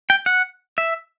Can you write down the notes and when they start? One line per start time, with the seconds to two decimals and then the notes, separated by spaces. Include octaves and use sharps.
0.10 G5
0.26 F#5
0.78 E5